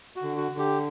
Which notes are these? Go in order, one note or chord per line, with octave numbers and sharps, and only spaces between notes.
F#4
D3
F#4
D3
G4